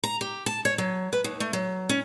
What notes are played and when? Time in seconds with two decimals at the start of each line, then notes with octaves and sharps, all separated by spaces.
0.04 A#5
0.21 G4
0.46 A5
0.65 C#5
0.78 F#3
1.13 B4
1.24 D#2
1.40 A3
1.53 F#3
1.89 C#4